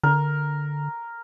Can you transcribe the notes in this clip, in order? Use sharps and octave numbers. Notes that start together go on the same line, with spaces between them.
D3 A#4